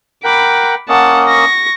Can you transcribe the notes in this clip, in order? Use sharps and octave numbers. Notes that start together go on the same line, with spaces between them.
A#4 F#5 G5 B5 D6
A#3 C#4 D#5 F#5 A5
C#6 A#6